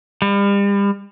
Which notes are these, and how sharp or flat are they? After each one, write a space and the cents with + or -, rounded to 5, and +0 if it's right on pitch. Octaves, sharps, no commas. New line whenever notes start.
G3 +40